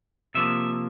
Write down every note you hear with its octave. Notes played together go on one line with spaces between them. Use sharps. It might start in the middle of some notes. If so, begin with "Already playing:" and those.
C3 F3 A#3 E5